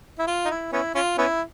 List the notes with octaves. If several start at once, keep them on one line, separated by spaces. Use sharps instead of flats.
E4
F4
D#4
E4
B3 C#4 E4
C#4 F4
B3 C#4 E4